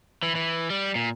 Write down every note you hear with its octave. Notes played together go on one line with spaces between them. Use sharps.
E3
E3
G3
A#2